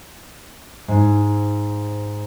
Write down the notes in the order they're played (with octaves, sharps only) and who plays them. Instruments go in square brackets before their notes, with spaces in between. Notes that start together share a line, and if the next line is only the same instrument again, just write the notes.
[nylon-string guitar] G#2